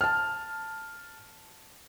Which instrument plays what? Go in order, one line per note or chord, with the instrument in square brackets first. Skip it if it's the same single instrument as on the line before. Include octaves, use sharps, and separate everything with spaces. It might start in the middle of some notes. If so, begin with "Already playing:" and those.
[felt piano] A5 F6